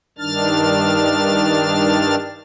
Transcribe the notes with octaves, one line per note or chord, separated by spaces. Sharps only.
G2 D#3 D4 F6 A6